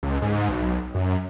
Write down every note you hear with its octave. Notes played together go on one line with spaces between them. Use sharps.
C#2
G#2
B1
F#2